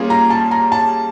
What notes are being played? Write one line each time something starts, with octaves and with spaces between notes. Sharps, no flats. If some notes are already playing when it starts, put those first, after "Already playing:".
Already playing: G3 A#3 C#4 F4 G#4
A#5
A5
A#5
A5